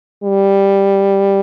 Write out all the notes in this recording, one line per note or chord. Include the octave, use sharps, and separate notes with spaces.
G3